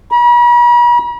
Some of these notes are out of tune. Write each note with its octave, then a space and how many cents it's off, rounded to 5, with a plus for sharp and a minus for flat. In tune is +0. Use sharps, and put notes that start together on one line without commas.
B5 -45